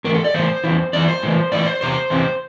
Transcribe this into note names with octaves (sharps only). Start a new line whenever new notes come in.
A2 E3 A#4
A4
D5
A2 E3 C5
E2 E3
E2 E3 D5
C5
A2 E3
A2 E3 D5
C5
E2 C3 C5
E2 C3 E3